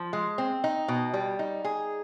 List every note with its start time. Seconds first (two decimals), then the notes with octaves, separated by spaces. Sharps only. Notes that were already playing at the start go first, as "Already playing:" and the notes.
Already playing: F3
0.13 G#3
0.38 C4
0.64 D#4
0.88 B2
1.13 G3
1.39 D#4
1.64 G#4